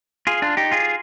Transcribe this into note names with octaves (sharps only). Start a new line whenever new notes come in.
F4 G#4
D4 F4
D#4 G4
F4 G#4